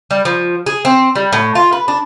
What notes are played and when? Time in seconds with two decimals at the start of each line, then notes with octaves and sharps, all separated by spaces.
0.11 G3
0.25 F3
0.66 G#4
0.85 C4
1.16 G3
1.33 A2
1.55 F4
1.72 B4
1.88 D4